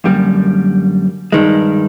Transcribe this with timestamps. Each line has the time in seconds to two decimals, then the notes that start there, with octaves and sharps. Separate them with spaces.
0.04 F#2 D3 G3 A#3
1.32 G2 D#3 G#3